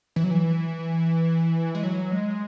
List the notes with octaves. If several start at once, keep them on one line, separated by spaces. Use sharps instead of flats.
E3
F#3
E3
G#3
F#3
G#3